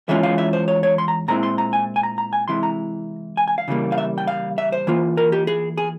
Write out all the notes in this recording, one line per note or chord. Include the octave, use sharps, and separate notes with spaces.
E2 E3 G#3 C#4 F4 E5
F5
E5
C5
C#5
C#5
C6
A#5
A#2 G#3 C4 E4 A#5
C6
A#5
G#5
G#5
A#5
A#5
G#5
C3 E3 G#3 E4 C6
A#5
G#5
G#5
F5
C#3 E3 G3 A#3
F5
E5
G5
F5
E5
C5
E3 A#3 F4
A#4
G4
G#4
G#4